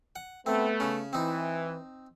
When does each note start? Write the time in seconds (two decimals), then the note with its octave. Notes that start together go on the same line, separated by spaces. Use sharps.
0.16 F#5
0.46 A3 B3 C4
0.80 C#3 C#4
1.13 E3 C4 D#4